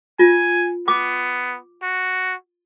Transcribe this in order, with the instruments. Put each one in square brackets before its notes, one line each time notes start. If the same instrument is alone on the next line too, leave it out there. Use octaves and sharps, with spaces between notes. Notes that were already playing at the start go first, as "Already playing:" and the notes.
[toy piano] F4 [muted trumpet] G#5
[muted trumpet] B3 [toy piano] D6
[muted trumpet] F#4